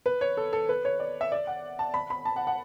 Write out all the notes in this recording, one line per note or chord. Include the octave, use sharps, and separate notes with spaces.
B4
C#5
A4
A4
B4
C#5
D5
E5
D5
F#5
A5
B5
B5
A5
F#5
F#5